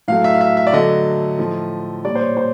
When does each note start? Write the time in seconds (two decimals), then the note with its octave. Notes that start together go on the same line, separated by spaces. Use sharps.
0.08 A2 F#3 A3 F5
0.24 E5
0.34 F5
0.41 E5
0.57 E5
0.67 D5
0.73 D3 F#3 A3 D#5
1.39 A2 F3 A3
2.04 A#2 G3 D5
2.15 C5
2.21 C#5
2.37 C5